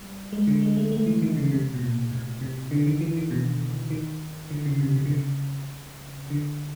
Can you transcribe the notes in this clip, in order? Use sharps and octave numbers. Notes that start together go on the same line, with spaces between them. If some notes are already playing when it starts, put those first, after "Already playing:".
Already playing: G3
G#3
D3
G#3
A3
A3
E3
D#3
C#3
C3
B2
A#2
A2
C3
D3
D#3
E3
D#3
B2
D#3
D3
C#3
C3
C3
D3
C#3
D3